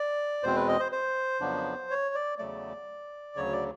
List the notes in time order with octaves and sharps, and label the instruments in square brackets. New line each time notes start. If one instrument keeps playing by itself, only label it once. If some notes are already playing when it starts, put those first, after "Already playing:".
Already playing: [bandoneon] D5
E2 B2 G#3 C4 C5
B4
D#5
C5
C5
F2 C#3 F#3 B3 D4
C#5
D5
E2 C#3 F#3 A3 D5
D2 C#3 F#3 C#5
D5